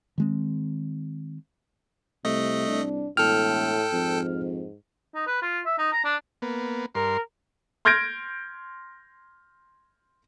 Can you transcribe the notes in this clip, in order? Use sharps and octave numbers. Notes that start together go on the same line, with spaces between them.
D#3 G#3 C4
C2 C3 A3 D#5
D4
E1 A2 A4 G5 F6
F2 G#2
D#4
B4
F4
E5
D#4
A#5
D4
A#3 B3
G2 A#4 C6
C6 F6 G6 G#6 A#6 D7